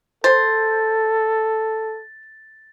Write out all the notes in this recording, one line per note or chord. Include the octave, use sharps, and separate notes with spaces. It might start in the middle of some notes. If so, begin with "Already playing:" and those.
A4 C5 A6